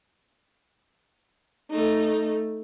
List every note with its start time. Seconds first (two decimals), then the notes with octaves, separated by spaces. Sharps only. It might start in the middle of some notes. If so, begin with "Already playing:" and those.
1.70 A3 D#4